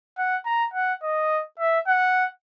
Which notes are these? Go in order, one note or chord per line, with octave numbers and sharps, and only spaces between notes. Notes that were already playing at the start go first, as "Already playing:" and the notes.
F#5
A#5
F#5
D#5
E5
F#5